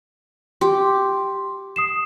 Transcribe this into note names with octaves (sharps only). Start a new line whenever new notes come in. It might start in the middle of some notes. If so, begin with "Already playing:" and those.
G4 C6
D#6 C7 E7